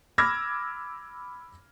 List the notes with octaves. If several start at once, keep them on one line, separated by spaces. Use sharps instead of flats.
B5 D6 E6 F6 G#6 A#6